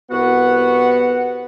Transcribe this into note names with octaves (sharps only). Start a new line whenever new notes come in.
C2 B3 F#4 F#5